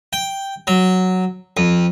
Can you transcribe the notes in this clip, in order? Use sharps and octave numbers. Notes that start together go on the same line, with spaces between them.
G5
F#3
F2